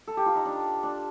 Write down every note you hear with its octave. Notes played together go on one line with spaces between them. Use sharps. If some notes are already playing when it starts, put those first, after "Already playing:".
A4
G4
F4
D#4
D4
D4